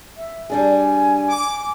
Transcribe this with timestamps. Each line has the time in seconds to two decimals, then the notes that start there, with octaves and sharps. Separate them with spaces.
0.17 E5
0.50 G3 D4 G#4 G#5
1.29 D6